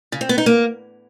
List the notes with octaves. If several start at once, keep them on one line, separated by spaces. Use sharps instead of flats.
C#3
C4
B3
D#4
A#3